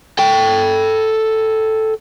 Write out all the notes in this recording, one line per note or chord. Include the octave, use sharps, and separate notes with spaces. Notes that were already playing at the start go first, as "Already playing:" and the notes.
A4 G5